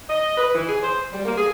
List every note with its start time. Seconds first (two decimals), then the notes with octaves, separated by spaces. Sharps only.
0.10 D#5
0.38 B4
0.55 E3
0.69 G#4
0.83 C5
1.13 G3
1.25 A#3
1.38 G#4